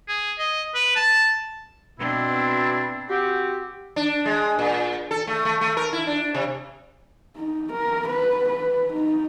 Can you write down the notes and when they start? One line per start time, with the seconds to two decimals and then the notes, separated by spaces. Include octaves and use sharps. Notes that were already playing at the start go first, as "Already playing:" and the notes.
0.08 G#4
0.39 D#5
0.75 B4
0.96 A5
1.99 B2 C4 D4 E4
3.09 C4 F#4 G4
3.96 D4
4.25 G#3
4.59 A#2
5.11 A4
5.27 A3
5.45 A3
5.61 A3
5.77 A#4
5.93 E4
6.07 D4
6.34 C3
7.36 D#4
7.73 A#4
8.09 B4
8.49 B4
8.93 D#4